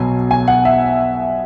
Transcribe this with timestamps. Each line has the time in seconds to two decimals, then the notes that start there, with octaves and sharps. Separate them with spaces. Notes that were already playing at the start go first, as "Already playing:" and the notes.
Already playing: B1 B2 F#3 G#5
0.31 G#5
0.48 F#5
0.65 E5